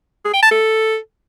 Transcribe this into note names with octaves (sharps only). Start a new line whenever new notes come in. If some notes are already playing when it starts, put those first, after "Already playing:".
G#4
G5
A5
A4